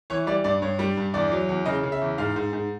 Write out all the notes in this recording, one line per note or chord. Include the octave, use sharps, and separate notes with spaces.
E3 C#5
G3 D5
G2 D5
G2 C#5
G3
G2
E2 D5
F#3
E2
C#3 D#5
C#3
E5
E2
G#2 F5
G#2
G#2